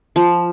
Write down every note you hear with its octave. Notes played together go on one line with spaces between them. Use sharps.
F3